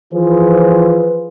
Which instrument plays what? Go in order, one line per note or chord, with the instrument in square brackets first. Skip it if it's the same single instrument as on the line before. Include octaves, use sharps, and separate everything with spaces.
[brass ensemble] E3 F3 F4 G#4 B4 C5